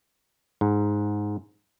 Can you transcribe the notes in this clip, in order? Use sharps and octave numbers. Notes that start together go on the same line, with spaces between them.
G#2